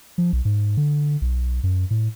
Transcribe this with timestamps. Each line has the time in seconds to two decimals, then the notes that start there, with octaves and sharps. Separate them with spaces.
0.18 F3
0.33 B1
0.45 G#2
0.77 D3
1.22 B1
1.63 F#2
1.90 A2